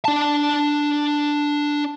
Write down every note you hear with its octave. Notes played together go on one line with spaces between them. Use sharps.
D4 A5